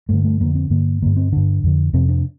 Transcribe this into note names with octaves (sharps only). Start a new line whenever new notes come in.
G2 D3 A3
A3
F2 D3 A#3
C4
G2 D3 A#3
G2 D3 A#3
C4
G2 D3 D4
F2 D3
F2 C3 C4
D4